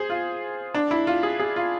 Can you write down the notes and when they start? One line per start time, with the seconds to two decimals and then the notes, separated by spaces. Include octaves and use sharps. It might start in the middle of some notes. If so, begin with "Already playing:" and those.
Already playing: G#4 C5
0.10 F4
0.74 D4
0.91 E4
1.07 F4
1.23 G#4
1.39 G#4
1.56 F4